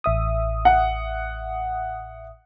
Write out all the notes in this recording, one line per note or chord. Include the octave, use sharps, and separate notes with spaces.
A1 E5 D#6
F#5